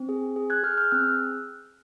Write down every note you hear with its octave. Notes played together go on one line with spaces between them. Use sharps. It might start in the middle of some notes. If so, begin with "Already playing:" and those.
Already playing: C4
G#4
G#4
F#6 G#6
G#4 F6 G6
F6 G6
C4 E6 F#6